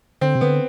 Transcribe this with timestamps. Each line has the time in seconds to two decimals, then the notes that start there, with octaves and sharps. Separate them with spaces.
0.21 D3 C4
0.35 C3
0.41 D3 B3